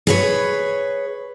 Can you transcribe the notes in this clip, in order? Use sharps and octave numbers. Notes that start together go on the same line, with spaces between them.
G#4 B4 C#5